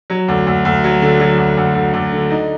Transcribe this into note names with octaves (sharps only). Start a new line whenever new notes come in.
F#3
D2
D2
D2
F#3
D3
F#3
D2
D2
D2
D2
D3
D#4